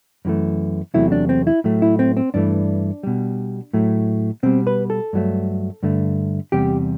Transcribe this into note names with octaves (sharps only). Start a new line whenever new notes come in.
F#2 E3 A3
E2 C3 F#3 A3 E4
D4
C4
E4
A2 F#3 A3
E4
C4
C4
G2 E3 A3 D4
B2 G3
A2 F#3 A3
B2 G3 C4
B4
A4
G2 F#3 A3
G2 D3 A3
E2 C3 G3 G4